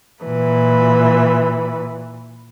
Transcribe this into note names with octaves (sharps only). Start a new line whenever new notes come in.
A#2 E3 B4